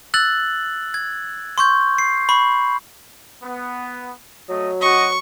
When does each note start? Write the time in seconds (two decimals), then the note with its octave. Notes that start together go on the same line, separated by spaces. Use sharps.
0.14 E6 F#6 A6 F#7
0.94 G#6
1.58 C6 C#6 G6
1.98 C7
2.29 B5 C#6
3.43 B3
4.49 F#3 A3 D#5
4.82 C#4 F#4 D#5 C#6